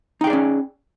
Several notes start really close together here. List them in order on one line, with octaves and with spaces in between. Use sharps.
D#4 G5 G#4 D5 C#4